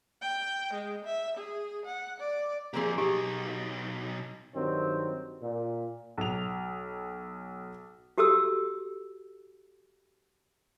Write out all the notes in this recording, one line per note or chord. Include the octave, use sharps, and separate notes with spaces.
G5
G#3
E5
G#4
F#5
D5
F3 A#3 C4 G4 G#4
B1 D#4 G4
G2 D#3 F#3 C4
A#2
B1 F7
F#4 G4 A4 D#6 E6